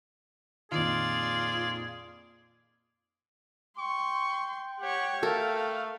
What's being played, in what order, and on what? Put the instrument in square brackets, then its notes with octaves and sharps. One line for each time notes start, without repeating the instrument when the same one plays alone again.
[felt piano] F2 A#2 D#3 [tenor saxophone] F4 [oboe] G#4 [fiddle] D5
[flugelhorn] G5 [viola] C6 [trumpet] C#6
[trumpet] G4 [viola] C#5 F#5
[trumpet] A3 [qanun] A4 A#4 [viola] F5